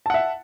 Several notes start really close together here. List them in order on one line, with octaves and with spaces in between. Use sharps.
A5 F#5 E5